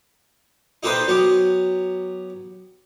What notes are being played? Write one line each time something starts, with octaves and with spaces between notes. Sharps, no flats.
D#4 G4 A4 B4 C5 D#5
F#3 B3 G4